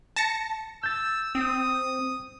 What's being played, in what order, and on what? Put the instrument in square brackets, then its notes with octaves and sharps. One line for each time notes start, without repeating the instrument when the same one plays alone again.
[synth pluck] A5 A#6 C#7
[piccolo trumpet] E6 [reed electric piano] G6 A6
[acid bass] C4 [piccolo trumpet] D#6